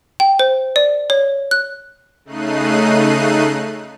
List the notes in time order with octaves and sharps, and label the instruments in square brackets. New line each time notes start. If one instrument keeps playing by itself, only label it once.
[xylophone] G5
C5
D5
C#5
F#6
[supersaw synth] C#3 A3 D#4 F#6 C7 D#7